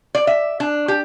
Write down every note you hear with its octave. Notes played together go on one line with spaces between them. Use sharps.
D5
E5
D4
G4